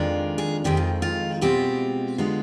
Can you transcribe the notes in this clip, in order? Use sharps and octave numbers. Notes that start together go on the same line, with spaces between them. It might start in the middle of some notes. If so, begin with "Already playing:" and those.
Already playing: F2 D#3 G#3 D4 F4
G#4
F2 D#3 G#3 C4 G4
F4
F4
B2 G#3 C4 F4 G4
D3 G#3 B3 F4